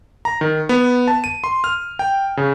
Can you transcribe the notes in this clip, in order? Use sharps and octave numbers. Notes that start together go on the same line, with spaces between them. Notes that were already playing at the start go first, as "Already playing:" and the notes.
A#5
D#3
B3
A5
D#7
C6
F6
G5
C#3